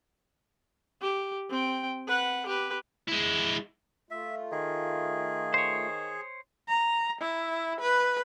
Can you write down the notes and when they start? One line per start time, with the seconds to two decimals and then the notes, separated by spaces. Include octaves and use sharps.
1.01 G4
1.50 C4 G5
2.07 B4 F#5
2.46 G4 B4
3.08 G#3 E4
4.11 A3 F4 E5
4.52 D#3 G#4
5.54 C5 C#5
6.68 A#5
7.21 E4
7.80 B4